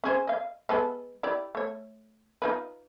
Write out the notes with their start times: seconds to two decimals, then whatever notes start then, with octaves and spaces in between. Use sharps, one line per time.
0.04 C#4 G#4 C5
0.27 D#5 F5
0.69 G#3 B3 A4
1.23 E4 G4 D5
1.55 A3 C#5
2.42 D#4 F4 B4